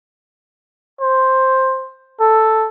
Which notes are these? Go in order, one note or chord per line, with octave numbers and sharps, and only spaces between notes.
C5
A4